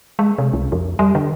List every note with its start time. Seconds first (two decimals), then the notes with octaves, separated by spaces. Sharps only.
0.19 G#3
0.38 C3
0.53 C2
0.72 F2
0.99 G3
1.15 D3